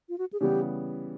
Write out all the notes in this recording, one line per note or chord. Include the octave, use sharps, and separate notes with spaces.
F4
F#4
G#4
C#3 E3 G3 B3 G4